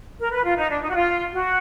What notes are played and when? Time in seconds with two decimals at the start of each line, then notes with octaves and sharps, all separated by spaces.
0.20 A#4
0.32 B4
0.45 F4
0.58 D#4
0.70 D4
0.83 D#4
0.89 F#4
0.95 F4
1.33 F#4